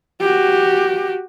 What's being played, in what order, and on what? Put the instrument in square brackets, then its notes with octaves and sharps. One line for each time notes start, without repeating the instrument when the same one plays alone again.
[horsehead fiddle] F#4 G4